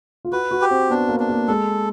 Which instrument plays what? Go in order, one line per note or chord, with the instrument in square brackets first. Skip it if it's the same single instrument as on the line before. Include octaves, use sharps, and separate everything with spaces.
[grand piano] F4
[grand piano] F#4 [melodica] B4
[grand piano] F#4
[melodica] G4
[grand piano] C4
[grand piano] B3 [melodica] D4
[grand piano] A#3
[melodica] D4
[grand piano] A#3
[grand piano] G#3 [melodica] A4